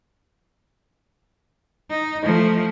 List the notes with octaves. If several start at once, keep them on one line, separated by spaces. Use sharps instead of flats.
D#4
F3 A3